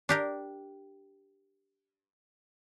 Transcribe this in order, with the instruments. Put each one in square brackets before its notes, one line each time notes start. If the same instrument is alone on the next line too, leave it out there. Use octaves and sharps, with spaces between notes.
[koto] D4 G4 A#4